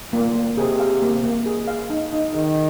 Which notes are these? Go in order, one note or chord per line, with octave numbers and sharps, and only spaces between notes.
A#2 A#3
A#3
C3 G#4
F5
A#3
A#3
G#4
F5
D#4
D#4
D#3 G#4